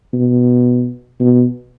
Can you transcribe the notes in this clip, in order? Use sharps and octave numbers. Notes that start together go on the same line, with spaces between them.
B2
B2